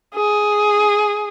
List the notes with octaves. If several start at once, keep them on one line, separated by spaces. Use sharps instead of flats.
G#4